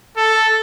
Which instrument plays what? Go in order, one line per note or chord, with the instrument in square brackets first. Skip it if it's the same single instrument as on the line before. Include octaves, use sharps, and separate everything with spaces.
[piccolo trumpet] A4